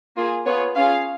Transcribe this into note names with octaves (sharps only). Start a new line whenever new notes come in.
A#3 F4 G#4
B3 F4 G#4 C#5
C#4 F4 G#4 F5